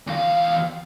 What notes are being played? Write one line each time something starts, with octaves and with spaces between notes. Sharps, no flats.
E2 F5